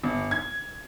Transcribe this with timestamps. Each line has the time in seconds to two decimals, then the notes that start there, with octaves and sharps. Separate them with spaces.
0.03 G1
0.31 G#6